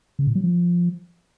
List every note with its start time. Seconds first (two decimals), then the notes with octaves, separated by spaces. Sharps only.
0.19 C#3
0.27 A#2
0.35 F#3
0.44 F3